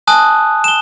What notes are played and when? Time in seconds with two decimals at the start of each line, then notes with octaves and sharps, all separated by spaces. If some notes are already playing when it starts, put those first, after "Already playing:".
0.07 G#5 A5 D#6 F#6
0.64 E7 G7